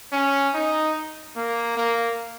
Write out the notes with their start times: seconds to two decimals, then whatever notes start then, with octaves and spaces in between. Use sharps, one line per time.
0.12 C#4
0.54 D#4
1.36 A#3
1.77 A#3